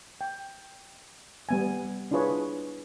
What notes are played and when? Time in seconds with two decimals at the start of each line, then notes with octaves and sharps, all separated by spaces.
0.21 G5
1.49 G3 B3 G#5
2.11 D4 E4 F4 G#4 B4 C#5